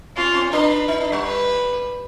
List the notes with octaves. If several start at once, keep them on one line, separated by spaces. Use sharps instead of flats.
C4 F4
C4
D4 B4
D#4
D4
G3
B4